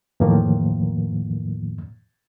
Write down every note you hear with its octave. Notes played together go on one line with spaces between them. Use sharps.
E2 A2 D#3 F3 A#3